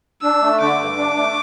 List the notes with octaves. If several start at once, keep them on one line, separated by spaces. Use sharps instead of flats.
D4 E6
A3
D3 D6
G2
D4
A3